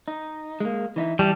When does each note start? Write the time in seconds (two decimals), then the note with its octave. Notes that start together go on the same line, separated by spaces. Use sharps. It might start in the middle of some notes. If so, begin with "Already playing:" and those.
0.08 D#4
0.60 G#3 A#3
0.96 E3 D#4 E4
1.19 E3 G3 G4 A5